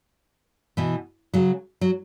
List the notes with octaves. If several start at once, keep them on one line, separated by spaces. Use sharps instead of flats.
B2 E3
C#3 F#3
F#3